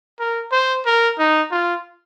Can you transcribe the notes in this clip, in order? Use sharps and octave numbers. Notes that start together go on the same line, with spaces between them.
A#4
C5
A#4
D#4
F4